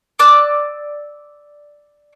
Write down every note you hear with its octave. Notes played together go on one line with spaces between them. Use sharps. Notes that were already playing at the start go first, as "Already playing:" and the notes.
D5 D6 E6 F#6